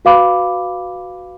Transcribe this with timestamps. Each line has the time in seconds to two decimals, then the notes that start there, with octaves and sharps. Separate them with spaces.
0.05 F#4 B4 F5 B5 D6